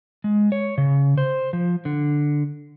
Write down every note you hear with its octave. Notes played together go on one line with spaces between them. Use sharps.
G#3
C#5
C#3
C5
F3
D3